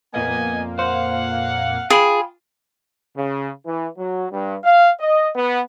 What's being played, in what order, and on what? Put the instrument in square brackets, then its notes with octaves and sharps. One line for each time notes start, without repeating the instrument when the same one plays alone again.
[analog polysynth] F2 A#2 A#3 [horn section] B3 D#5 G#5
[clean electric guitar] C5 [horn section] F5 F#5
[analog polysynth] F4 [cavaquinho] G#4 [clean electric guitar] F5 G5 B5
[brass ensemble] C#3
E3
F#3
G2
F5
D#5
B3